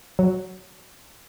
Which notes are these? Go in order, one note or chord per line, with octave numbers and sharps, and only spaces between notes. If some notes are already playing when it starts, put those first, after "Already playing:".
F#3